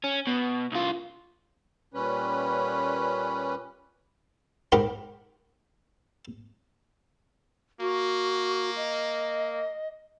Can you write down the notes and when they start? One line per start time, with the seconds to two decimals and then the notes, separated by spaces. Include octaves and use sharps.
0.04 C#4
0.27 B2
0.72 C2 F4
1.94 A#2 G3 C#4 B4
4.72 G#2 G4 A#4 F#5 G5 B5
7.80 A#3 F#4
8.76 D#5